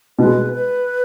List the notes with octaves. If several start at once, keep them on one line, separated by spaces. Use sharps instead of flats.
B2 G#3 B4
B4